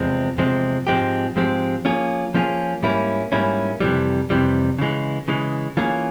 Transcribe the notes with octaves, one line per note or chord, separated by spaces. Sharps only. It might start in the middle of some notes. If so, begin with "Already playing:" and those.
Already playing: E2 C3 F3 G#3 C4
E2 C3 F3 G#3 C4
G#2 F3 G#3 C4 G4
G#2 F3 G#3 C4 G4
F3 A#3 C#4 F4 G#4
F3 A#3 C#4 F4 G#4
G#2 G3 A#3 C#4 E4
G#2 G3 A#3 C#4 E4
F2 C3 E3 G3
F2 C3 E3 G3
C#3 E3 G#3
C#3 E3 G#3
E3 A#3 C#4 F4 G#4